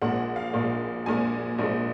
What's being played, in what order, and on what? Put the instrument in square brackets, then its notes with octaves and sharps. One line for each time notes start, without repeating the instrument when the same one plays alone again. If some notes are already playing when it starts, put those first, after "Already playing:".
[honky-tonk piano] A#1 A#2 G#3 F#5
F5
A#1 A#2 G#3
A#1 A#2 G#3 G#5
A#1 A#2 G#3